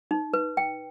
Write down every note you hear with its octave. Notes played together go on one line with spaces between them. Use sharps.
D#4
B4
G5